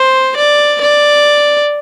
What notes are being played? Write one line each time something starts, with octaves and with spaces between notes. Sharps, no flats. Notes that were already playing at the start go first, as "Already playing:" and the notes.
Already playing: C5
D5
D5